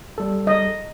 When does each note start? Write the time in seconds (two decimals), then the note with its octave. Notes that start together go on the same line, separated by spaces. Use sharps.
0.18 G3 A4
0.47 D#5